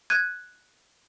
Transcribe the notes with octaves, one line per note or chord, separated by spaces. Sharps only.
F#6 G#6 D#7